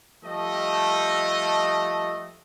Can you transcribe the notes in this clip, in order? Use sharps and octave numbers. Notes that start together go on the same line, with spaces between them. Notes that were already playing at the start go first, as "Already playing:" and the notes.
F3 G3 A3 D#5